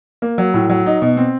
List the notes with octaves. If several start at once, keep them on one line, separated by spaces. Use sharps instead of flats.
A#3
F#3
A2
F#3
D#4
B2
C4